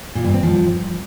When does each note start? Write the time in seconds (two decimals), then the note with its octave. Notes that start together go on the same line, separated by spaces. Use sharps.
0.15 A#2
0.25 G2
0.34 C4
0.43 F3